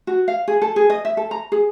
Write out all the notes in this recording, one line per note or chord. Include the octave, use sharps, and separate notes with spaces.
F#4
F5
G#4
A4
G#4
D#5
E5
A4
A#5
G#4